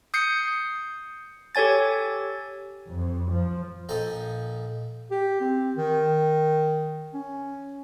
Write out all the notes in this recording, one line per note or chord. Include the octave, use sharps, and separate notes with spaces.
D#6 G6 C7 C#7
G4 A4 C#5 G#5 A6
F2
F3
A#1 F3 A4 C5 D#5 A#5
G4
C4
D#3
C#4